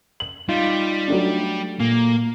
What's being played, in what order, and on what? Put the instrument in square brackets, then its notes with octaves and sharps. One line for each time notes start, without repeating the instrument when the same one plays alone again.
[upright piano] F#7
[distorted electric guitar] G3 [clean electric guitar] D#4 F4
[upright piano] F#3 A3 D4
[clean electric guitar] A#2 [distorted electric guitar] A#3